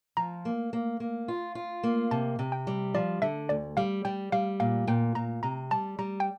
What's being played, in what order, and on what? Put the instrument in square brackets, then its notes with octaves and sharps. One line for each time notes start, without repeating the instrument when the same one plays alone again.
[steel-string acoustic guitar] F3 [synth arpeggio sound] A#5
[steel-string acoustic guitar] A#3
A#3
A#3
F4
F4
A#3
[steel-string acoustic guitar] C3 [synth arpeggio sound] A5
[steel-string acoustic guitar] C3
[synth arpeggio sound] G5
[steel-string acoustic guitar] G3
[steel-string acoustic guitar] F3 [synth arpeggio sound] D5
[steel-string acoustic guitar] D3 [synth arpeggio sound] E5
[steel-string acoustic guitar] D2 [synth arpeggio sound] D5
[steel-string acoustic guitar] G3 [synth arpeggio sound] F5
[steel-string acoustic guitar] G3 [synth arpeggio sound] G5
[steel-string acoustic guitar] G3 [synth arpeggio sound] F5
[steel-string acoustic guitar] A#2 [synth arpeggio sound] F5
[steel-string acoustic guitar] A#2 [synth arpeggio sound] G5
[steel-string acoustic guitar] A#2 [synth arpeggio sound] A#5
[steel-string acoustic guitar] C3 [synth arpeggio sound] A#5
[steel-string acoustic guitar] G3 [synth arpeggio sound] A5
[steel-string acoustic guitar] G3 [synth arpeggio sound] A#5
[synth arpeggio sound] G5